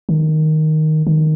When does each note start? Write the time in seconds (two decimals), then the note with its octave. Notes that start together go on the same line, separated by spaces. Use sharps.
0.09 D#3
1.07 D#3